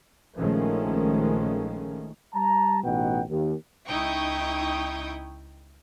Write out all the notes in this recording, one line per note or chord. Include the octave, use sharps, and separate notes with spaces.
A#1 D#3 F3 G#3 A3 C#4
G3 A5 A#5
A1 B2 D#4 F#5 G5
D#2
C#2 D#4 E4 G5 C#6 D#6